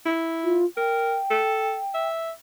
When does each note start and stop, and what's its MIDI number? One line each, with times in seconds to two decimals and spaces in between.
0.06 0.62 64
0.44 0.65 65
0.77 1.17 70
0.77 2.08 79
1.31 1.78 69
1.94 2.31 76